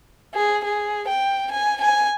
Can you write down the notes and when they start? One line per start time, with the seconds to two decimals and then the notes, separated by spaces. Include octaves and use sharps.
0.34 G#4
0.64 G#4
1.08 G5
1.52 G#5
1.81 G#5